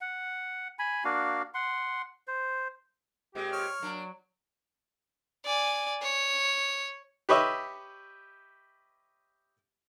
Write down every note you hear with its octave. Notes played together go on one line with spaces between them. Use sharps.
F#5
G#5 B5
A#3 D4 F#4 F5
F#5 C6
C5
A#2 G#3 C4 G4
C#5 F6
F#3 A#3 D4
D5 G#5
C#5
G4 B4 C#5 D#5 E5